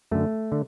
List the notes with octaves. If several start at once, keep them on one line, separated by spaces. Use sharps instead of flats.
F#2 D3 A3
D3